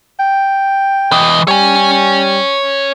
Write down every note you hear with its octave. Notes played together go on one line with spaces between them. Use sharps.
G5
E3 D#5
G3 C#5 G#5